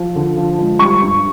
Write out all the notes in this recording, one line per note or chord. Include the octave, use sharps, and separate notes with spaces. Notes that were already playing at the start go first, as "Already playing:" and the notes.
Already playing: F3
D3
F3
G#3
G3 C#6
G2